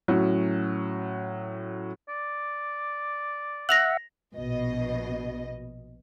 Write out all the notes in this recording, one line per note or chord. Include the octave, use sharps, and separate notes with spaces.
A2 F#3 C#4
D5
E5 F#5 A#6 F7 F#7
A#1 B2 D#5